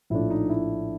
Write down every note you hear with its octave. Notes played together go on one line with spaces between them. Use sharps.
A#1 A2 F3 A3 D4 E4
D#4
E4